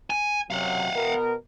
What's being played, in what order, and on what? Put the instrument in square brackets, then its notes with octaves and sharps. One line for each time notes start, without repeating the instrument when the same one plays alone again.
[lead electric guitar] G#5
[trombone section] F#2 C3 F#3 [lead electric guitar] F5 F#5
[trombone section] B2 B3 A#4